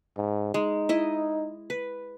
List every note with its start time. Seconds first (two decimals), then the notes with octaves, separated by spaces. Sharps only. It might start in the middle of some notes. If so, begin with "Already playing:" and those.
0.17 G#2
0.54 G#3 D#4
0.89 E4 D#5
1.70 B4